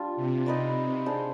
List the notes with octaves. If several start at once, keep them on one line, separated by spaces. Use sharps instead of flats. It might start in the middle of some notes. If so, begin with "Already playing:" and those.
Already playing: G3 D4 F4
C3
C3 D#4 B4 D5
D4 G#4 C5